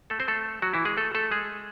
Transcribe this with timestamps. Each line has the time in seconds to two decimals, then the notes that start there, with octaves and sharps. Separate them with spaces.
0.10 A3 A4
0.20 C4 C5
0.28 A3 A4
0.62 F#3 F#4
0.74 E3 E4
0.85 G#3 G#4
0.97 A3 A4
1.15 A3 A4
1.31 G#3 G#4